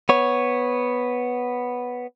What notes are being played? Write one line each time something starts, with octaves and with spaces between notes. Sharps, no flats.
B3 C#5